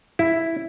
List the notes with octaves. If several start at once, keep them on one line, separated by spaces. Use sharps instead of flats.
E4